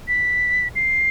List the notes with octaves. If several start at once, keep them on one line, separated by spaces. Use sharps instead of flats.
B6
C7